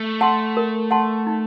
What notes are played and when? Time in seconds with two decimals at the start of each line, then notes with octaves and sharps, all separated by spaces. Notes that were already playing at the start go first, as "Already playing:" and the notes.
Already playing: A3
0.21 F#5 A5 C6
0.57 A#4
0.91 F#5 A5 C6
1.27 D#4